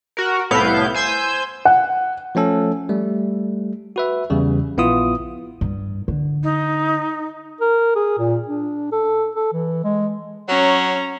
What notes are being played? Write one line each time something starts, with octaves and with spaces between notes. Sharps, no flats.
F#4 A#4
C2 A2 B3 E4 F5 G6
C5 G#5 E6 G6
F#5
F3 A3 C#4 A4
G3 A3
F#4 B4 E5
E2 C#3 G3
A#1 B3 E4 F4 D#6
G2
D3
D#4
A#4
G#4
A#2
D4
A4
A4
E3
G#3
F#3 C#4 A#5